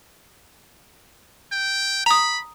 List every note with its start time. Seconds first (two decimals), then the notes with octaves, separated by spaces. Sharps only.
1.52 G5
2.06 A#5 B5 D#6